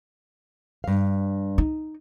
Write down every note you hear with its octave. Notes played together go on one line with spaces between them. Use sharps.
G2 F5
D#4